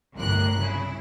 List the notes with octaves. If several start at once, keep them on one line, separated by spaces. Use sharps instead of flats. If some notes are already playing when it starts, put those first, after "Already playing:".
G1 C2 F#2 A2 A#4 F#6
C#3 E4